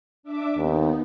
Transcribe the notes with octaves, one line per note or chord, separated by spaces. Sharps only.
D4 E5 D6
D#2 B3 D#4